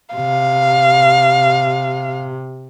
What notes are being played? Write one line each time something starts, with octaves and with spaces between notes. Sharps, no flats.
C3 F5